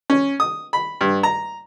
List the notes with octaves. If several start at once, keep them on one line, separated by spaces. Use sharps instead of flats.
C#4
D#6
B5
G2
A#5